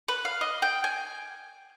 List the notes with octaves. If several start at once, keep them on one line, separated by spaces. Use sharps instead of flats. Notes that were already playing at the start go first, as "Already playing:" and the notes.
B4
F5
D#5
G5
G#5